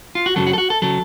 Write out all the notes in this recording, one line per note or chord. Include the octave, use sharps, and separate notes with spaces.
F4
F#4
F#2 C#3 F#3 A4
F#4
A4
F#4
A4
C#3 F#3 A4